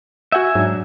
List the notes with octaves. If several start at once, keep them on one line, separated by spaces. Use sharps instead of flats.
F#4 E5 F#5 G#5 G6
G#2 F#3 D4